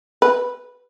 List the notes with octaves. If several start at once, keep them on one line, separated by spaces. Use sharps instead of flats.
B4